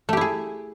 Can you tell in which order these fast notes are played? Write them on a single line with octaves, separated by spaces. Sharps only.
A3 G4 E4 G#4